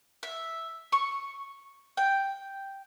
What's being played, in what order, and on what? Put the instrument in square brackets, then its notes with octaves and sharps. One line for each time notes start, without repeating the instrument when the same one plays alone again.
[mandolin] E5
C#6
G5